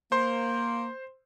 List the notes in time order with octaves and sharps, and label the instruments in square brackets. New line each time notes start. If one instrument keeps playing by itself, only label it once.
[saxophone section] A#3 [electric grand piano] C5 C6